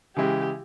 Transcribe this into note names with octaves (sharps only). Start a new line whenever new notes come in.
C#3 E3 G#3 E4 G4